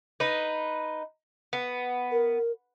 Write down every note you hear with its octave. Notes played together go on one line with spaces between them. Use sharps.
D#4 B4
B3
A#4